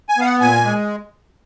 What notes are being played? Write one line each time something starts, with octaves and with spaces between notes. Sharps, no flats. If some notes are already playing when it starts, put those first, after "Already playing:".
G#5
B3 F5
F#5
A#2 G#5
G#3